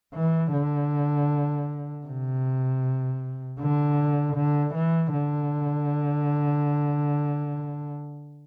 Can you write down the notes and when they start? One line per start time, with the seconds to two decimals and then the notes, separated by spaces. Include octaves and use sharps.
0.14 E3
0.52 D3
2.06 C3
3.60 D3
4.36 D3
4.74 E3
5.13 D3